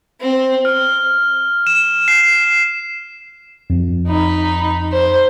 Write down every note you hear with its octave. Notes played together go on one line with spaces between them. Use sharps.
C4
F6
E7
C7
F2
D#4 B5
C5